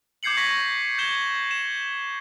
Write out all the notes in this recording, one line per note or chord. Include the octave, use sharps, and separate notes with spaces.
D6 G6 G#6 C7 C#7 F#7
C#6 G#6 A#6 B6 F#7
G6 G#6 E7 G7
E7